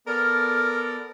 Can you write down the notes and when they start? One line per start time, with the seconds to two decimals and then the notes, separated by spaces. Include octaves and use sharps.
0.07 B3 A4 A#4 D5 F6